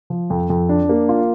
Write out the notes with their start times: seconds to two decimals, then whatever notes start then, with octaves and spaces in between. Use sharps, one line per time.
0.10 F3
0.30 F2
0.50 F2
0.69 D4
0.89 A#3
1.09 F4